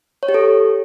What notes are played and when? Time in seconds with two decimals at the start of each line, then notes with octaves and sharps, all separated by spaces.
0.23 C#5
0.29 G4
0.34 A4